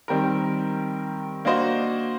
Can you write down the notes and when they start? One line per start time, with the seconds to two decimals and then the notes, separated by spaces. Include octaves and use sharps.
0.08 D#3 G3 C4 G4 A#4
1.45 A#3 D4 F#4 C5 D#5